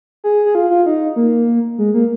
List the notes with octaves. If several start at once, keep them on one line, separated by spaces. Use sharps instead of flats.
G#4
G#4
F4
F4
D#4
A#3
G#3
A#3